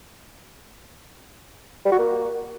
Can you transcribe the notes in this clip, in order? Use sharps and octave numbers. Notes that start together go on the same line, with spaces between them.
G3
F#4
A#3